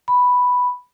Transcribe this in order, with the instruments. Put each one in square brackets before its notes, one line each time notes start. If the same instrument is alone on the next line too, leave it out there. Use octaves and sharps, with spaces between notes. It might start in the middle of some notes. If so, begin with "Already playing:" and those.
[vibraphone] B5